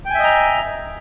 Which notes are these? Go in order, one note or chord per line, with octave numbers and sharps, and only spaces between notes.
D#5 E5 G5 G#5 A#5